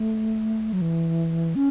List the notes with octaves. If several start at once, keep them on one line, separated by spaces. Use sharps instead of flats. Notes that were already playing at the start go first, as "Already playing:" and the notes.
Already playing: A3
F#3
E3
C#4